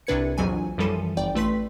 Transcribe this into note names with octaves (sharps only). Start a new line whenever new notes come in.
C2 C3 D4 B4 G#6 C#7
A#1 F2 E3 F#3 G#5 D#7
F#2 E3 F3 G3 A4 D#7
G1 D5 G5
A1 A3 B4 C6 B6